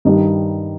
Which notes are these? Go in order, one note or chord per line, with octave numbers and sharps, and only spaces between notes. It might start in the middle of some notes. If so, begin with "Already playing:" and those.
G2 D#3 G3 D#4